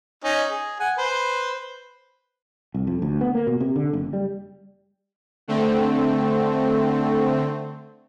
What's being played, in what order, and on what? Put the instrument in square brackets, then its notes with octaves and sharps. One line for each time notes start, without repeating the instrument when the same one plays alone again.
[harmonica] C#4 D#4
G#4
F#5 G#5
B4 C5
[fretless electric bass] C2
F2
D2
B3
A#3
B2
C3
D3
F#1
G3
[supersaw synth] D3 A3 C4